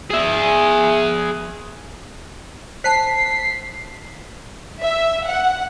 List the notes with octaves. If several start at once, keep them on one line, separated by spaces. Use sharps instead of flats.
G#4 E5
C5 A5 B6 C7
E5
F#5